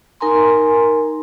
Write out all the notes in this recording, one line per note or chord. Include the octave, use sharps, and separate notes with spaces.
D#4 A#4 G#5 A#5 C6